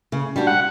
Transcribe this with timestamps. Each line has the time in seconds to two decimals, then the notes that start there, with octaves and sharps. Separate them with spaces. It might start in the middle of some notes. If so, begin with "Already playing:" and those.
0.12 C#3
0.36 G3 D4 F#4
0.47 F#5